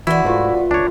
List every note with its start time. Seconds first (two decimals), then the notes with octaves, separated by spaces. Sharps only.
0.07 D3 E3 E4 F#4
0.24 G#2 F3 A3 B4
0.71 C#2 D4 C#5 A#5